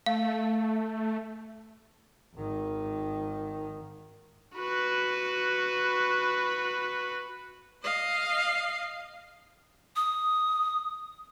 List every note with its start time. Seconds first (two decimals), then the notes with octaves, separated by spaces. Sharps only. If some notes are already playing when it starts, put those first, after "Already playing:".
0.06 A3 F5
2.35 G#1 D#3
4.56 F#4 B4
7.83 D#5 F5
9.96 D#6